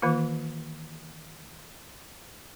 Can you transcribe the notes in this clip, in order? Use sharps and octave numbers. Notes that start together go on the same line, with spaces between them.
D#3 E3 A#3 F4